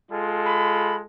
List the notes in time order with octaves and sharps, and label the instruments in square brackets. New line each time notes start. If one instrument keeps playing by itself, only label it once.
[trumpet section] G#3 F4 A4
[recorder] B5